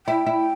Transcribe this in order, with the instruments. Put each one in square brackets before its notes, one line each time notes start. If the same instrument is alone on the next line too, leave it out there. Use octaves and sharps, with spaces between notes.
[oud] E4 [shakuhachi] G5
[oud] E4